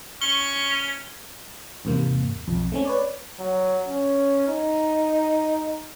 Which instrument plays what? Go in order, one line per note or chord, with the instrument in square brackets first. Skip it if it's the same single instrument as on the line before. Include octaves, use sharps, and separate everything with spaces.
[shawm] C#4 [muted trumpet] C#6 [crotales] G7
[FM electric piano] E2 G#2 C3 A#3
B1 F2
A3 C4 C#4
B4 C#5 D5
[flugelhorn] F#3
C#4
D#4